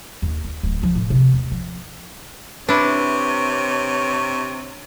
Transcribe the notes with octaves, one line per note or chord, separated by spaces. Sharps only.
D#2
D4
D1
F3
A2
C3
D#2
F3
C3 D4 E4 B4 C#5 B5